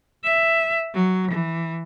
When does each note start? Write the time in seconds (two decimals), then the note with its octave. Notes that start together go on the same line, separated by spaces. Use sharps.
0.24 E5
0.94 F#3
1.31 E3